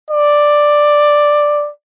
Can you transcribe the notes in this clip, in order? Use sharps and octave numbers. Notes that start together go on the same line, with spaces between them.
D5